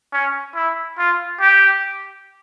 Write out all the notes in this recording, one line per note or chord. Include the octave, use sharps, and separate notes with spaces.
C#4
E4
F4
G4